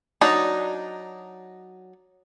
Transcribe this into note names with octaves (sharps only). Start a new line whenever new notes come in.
F#3 D4 D#4